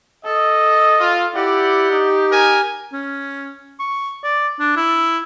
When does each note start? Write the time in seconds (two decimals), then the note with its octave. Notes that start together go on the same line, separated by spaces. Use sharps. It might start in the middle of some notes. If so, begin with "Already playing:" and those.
0.25 A4 D#5
1.00 F4
1.35 E4 G4 D5 F#5
1.90 D#4
2.31 A#4 G#5
2.93 C#4
3.80 C#6
4.23 D5
4.60 D4
4.76 E4